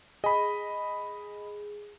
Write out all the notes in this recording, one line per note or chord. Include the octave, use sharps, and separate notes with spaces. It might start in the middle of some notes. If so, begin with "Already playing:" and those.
G#4 D#5 B5